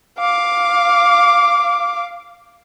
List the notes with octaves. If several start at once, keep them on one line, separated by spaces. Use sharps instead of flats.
F5 D6